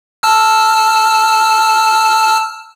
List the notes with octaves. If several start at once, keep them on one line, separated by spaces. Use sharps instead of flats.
A5 E6 F6